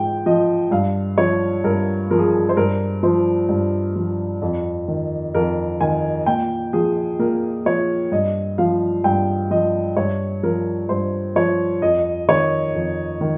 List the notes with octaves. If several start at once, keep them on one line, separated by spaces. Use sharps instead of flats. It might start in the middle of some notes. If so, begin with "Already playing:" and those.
Already playing: G#2 F3 G5
F3 D#5
G2 F5
F3 C#5
G2 A#4
F3 A#4
G#4
G#4
C5
G2 A#4
F3 C5
G2
F3
F2
D#3
F2 A#4
D#3 G#5
A#2 G5
F3 G#4
A#2 A#4
F3 C#5
G2 D#5
F3 F5
G2 G5
F3 D#5
G2 C#5
F3 A#4
G2 C5
F3 C#5
F2 D#5
D#3 C#5
F2
D#3